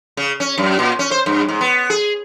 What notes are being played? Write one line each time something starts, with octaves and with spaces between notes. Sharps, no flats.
C#3
C#4
F#2
A#2
C#4
C5
G2
G#2
B3
G#4